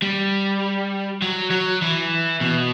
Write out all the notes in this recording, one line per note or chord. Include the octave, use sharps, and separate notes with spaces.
G3
F#3
F#3
E3
B2